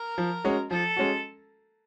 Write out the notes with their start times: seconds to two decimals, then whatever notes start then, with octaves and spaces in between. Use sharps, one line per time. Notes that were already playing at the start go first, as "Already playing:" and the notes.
Already playing: A#4
0.18 F3
0.44 G#3 C#4 F#4
0.70 F3 A4
0.97 G#3 C#4 F#4